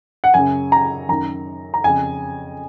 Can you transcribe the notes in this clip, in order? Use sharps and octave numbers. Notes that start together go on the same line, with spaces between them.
F#5
F#2 C#3 G#5
A#5
F#2 D#3 A#5
A#5
F2 C#3 G#5